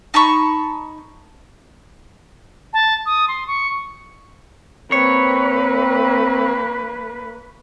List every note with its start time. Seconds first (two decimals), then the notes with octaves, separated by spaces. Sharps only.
0.14 D#4 A5 B5 C#6
2.73 A5
3.06 D#6
3.28 C6
3.47 C#6
4.92 A#3 C4 B4 C#5